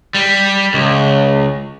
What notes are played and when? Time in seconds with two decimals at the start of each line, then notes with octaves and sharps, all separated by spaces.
0.15 G3
0.74 C#2